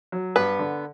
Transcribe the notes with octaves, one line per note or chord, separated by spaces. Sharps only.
F#3
G2 B3 B4
D3